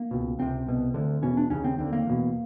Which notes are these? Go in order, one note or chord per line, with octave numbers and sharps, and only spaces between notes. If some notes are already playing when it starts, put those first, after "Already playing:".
Already playing: A#3
C#2 B2
C#2 C3 C4
C2 B2
D2 D3
E2 B2 C#4
D4
D#2 C#3 C#4
C4
D#2 D3 C4
A#3
E2 B2